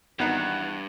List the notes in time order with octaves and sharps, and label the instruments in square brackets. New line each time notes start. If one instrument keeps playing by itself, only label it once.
[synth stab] G#1 B3 D#4 [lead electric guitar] G2 [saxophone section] E3 F#5